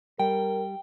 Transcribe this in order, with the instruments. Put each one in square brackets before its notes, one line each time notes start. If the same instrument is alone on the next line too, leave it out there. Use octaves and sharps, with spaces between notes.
[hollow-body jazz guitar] G3 [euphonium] A#4 [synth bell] G5